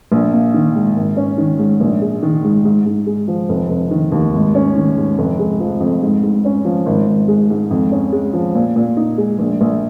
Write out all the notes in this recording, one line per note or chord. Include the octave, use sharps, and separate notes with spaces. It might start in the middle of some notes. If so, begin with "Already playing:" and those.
A#1
A#3
D#3
G#2
G#1
C#4
D#3
G#2
A#1
G#3
D#3
G#2
G#2
G#2
G#3
F3
F1
F1
D#3
D#2
G#1
C#4
D#3
G#2
F1
G#3
F3
F2
G#2
G#2
C#4
F3
G#1
G#1
G#3
G#2
F2
C#4
G#3
F3
A#2
A#2
D#4
G#3
A#1
A#1